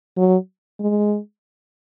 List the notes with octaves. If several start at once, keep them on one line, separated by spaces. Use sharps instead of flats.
F#3
G#3